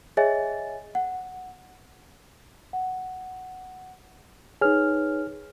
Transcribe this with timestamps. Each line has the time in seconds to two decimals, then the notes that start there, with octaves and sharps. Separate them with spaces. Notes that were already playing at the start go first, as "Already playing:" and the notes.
0.17 G#4 C#5 D#5 E5 G#5 A6
0.95 F#5
2.73 F#5
4.61 D#4 G#4 B4 C#5 F6